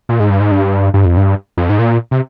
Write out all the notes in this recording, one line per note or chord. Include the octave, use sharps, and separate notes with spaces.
A#2
G#2
G2
G#2
G2
G2
F2
G2
F2
G#2
A#2
C3